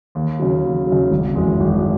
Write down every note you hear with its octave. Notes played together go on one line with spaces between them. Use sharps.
D#2
C#3 F#3
D#2
C#3 F#3
G#1
F#2 E3 G#3
G#1